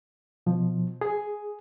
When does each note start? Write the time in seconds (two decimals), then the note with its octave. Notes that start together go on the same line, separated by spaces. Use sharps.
0.46 B2 F3
1.01 G#4